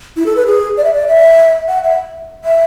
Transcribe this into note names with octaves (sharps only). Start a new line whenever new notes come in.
E4
A4
B4
G#4
D5
E5
D5
E5
F#5
E5
E5